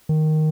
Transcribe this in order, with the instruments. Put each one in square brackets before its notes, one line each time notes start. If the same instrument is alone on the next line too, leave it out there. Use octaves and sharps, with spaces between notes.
[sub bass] D#3